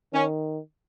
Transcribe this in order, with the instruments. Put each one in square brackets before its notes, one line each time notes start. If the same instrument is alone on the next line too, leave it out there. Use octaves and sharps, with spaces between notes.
[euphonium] D#3 [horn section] C#4